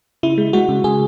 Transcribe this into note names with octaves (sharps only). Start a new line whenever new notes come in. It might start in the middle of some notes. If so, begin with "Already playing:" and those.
C#3 E4
G#3
G#3 F#4
C#3
C#3 G#4